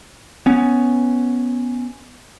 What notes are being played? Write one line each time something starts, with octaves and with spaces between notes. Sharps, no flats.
B3 C#4